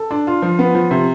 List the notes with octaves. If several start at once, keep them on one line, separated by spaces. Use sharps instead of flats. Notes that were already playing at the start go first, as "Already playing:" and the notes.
Already playing: A4
D4
F4
F3
B3
F3
C3